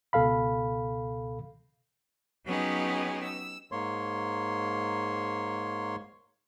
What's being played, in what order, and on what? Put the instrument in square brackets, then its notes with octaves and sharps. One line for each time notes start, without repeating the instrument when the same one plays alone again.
[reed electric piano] C#2 B2 A4 F5 B5
[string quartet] F#3 B3 C#4 D#4 G4 G#4
E6
[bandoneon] G#2 A#3 C#5 C6